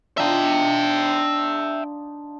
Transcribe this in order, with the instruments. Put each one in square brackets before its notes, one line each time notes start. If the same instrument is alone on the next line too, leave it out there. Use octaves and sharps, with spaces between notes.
[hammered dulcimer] D4 D#4 F4 [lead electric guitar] E5 G5